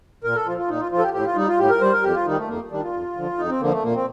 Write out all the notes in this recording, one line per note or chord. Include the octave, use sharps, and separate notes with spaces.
A#2 A#4
A4
F3 F4
F4
A#2 D#4
F4
F3 F4
A4
G4
A2 G4
F4
G3 D#4
F4
A2 G4
A#4
G3 C5
A#4
F2 G4
F4
D#3 G3 D#4
A3
F2 A#3
D#3 G3 D4
F4
F2
D3 F3
F2 D#4
C4
D3 F3 A#3
A3
A#2 A#3
C4